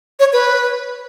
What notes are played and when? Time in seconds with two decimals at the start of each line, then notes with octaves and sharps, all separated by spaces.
0.20 C#5
0.33 B4